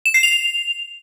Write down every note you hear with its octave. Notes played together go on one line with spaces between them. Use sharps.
E7
C7
F7